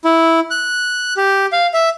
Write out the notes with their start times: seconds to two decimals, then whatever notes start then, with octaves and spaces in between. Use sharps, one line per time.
0.05 E4
0.50 F#6
1.17 G4
1.53 F5
1.74 E5